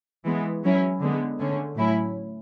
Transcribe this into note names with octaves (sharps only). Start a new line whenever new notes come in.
E3 G#3 B3
F#3 C#4 E4
D3 G#3 B3
D3 A3 C#4
A2 F#3 C#4 E4